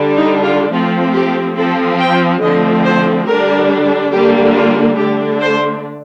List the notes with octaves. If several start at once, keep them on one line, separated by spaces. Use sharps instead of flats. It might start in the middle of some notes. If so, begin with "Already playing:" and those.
Already playing: D3 G3 D4
D#4
F4
F3 A3 C4 F4
G4
F3 C4 A4
G5
D3 F3 A3 C4 D#5
C5
D3 G3 D4 A#4
D3 G3 A#3 D4 G4
F4
D3 A3 D4 G4
C5